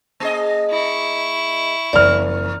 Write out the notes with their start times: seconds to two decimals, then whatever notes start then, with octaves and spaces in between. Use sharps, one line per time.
0.20 A#3 G#4 D#5
0.70 E4 C#6
1.93 F#1 E2 D5 F6